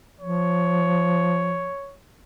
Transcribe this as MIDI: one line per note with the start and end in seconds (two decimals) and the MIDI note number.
0.21 1.71 53
0.21 1.96 73